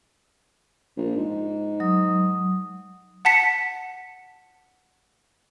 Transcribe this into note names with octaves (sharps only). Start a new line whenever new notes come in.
A#1
G#2
F#3 D#6
F#5 A5 B6 C#7